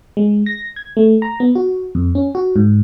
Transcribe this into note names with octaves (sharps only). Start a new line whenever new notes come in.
G#3
A#6
G#6
A3
A#5
B3
F#4
F2
C#4
F#4
G#2